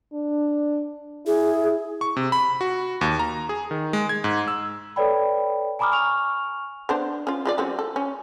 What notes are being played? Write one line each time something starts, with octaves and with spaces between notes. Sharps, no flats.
D4
E4 G#4
C#6
C3
B5
F#4
D#2
A#5
G#4
D#3
G#3
G#6
G#2
E6
A4 B4 C#5 D5 G5 B5
G#5 A#5 B5 D6 D#6 F6
G#5 C#6 F6 F7
B3 D4 C5
C#4 F4
G#3 F4 D5
F#3 C4 C#4
A4
C#4